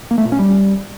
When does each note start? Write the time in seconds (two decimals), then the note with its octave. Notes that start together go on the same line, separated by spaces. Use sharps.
0.11 A#3
0.18 A3
0.25 A#2
0.32 C#4
0.39 G3